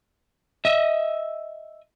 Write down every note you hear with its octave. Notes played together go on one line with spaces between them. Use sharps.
D#5 E5